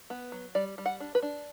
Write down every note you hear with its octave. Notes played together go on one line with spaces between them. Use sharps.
B3
F#3
G3 D5
G3
F#5
D4
B4
D4